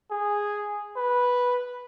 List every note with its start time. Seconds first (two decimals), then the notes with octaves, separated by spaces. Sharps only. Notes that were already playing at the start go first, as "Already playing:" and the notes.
0.11 G#4
0.96 B4